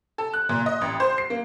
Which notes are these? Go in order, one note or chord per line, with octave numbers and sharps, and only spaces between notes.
A4
F#6
A#2
D#5
A1
C5
C7
A#3